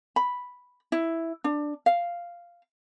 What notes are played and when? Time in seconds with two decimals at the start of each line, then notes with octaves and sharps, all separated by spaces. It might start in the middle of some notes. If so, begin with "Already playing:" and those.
0.16 B5
0.92 E4
1.44 D4
1.86 F5